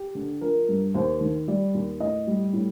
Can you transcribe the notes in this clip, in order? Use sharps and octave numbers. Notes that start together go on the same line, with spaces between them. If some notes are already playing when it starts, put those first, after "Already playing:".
Already playing: G4
D3
F3 A#4
G2
D#2 C5
D#3
G3 D5
D#2
A2 D#5
G3
A2